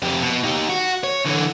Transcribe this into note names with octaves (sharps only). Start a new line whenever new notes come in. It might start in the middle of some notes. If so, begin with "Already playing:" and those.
F2 G4
B2
D#4 G4
F#4
C#5
D3 E3